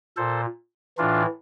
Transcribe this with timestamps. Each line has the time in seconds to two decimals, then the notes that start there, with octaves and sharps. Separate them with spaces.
0.17 A#2 A4 C5
0.98 A2 E3 D4 F4